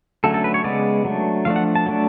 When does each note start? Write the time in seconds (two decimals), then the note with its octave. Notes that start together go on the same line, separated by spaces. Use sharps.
0.24 D3 F#3 A3 C#4 A4
0.34 A4
0.44 B4
0.54 C#5
0.64 C#3 G#3 B3 D5
1.05 F#3 A3 D4
1.45 F3 A3 D4 F5
1.56 F#5
1.75 A5
1.86 F#3 A3 D4